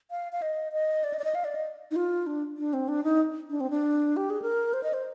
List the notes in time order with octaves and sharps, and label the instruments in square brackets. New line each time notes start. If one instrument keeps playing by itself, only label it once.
[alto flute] F5
F5
D#5
D#5
D5
D#5
D5
D#5
F5
D5
D#5
D#4
F4
D4
D4
C4
D4
D#4
D4
C4
D4
G4
G#4
A#4
C5
D#5
C5